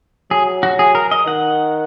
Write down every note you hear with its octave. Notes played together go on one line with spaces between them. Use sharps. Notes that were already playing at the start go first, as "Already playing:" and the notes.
F#3 G#4
F#4
G#4
A#4
D#5
D#3 F#5